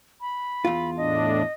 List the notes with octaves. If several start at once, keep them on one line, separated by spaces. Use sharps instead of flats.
B5
E2 F4
A2 D4 D#5